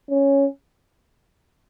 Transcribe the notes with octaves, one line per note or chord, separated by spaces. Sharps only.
C#4